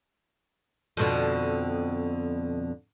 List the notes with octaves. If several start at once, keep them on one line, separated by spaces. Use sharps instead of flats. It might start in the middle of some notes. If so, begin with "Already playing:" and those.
F2 B2 D3